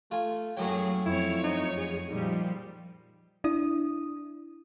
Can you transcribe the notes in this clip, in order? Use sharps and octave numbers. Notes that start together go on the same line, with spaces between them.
A3 F4 G#5
F#2 A2 F#3 A#3 G#4 C#5 G5
F2 E4 C#5
D#4
G#4
A#2 F3 G3 D#4
D4 E4 D#6